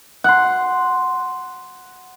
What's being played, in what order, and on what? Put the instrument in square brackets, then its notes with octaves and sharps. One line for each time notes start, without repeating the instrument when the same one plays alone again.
[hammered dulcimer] F#5 C6